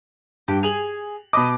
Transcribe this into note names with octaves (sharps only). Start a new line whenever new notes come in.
G2 G4
G#4 F7 F#7
B2 D#5 B5 D6